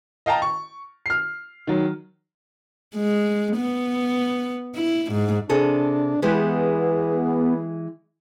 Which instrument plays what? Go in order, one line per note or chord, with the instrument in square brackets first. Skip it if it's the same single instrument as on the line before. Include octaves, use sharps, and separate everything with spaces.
[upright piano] D#5 F5 G5 A5 A#5
C#6
F6 C7
D#3 F#3
[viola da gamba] G#3
B3
E4
G#2
[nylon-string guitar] C3 G#4 A4 [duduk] D4
[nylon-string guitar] E3 G#3 G4 [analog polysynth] B3 [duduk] G#4